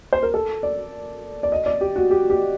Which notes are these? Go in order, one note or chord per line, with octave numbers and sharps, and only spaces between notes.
C5
A#4
A4
D5
D5
D#5
D5
G4
F#4
G4
G4